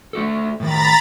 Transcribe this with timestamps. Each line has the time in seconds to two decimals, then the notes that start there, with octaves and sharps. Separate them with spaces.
0.13 A3 F#4 A4
0.60 A2 D#3 A#5 B5 A6